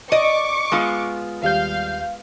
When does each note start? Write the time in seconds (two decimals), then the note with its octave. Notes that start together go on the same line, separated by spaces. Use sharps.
0.12 D5 D#5 C#6 D6
0.72 G#3 B3 F4
1.43 D#2 G3 F5 G6